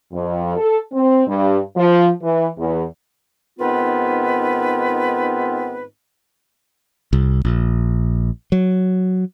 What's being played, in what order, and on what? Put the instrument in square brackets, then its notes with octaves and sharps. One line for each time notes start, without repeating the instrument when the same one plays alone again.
[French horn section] F2
A4
C4
G2
F3
E3
E2
[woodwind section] G#2 D#3 B3 C4 F4 B4
[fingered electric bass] C2
A#1
F#3